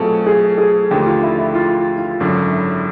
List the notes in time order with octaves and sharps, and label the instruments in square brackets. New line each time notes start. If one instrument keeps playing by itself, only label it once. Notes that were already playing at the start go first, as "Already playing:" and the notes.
Already playing: [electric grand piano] B2 F#3 A3 C4 F4 [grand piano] G#4 A4
[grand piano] G#4
G#4
[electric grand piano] D#2 D3 F3 A3 [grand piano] G4
[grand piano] F4
E4
E4
F4
F4
[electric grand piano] G#1 F#2 D3 F#3
[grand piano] E4